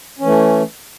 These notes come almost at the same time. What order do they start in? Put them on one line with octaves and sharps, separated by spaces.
C#4 E3 A3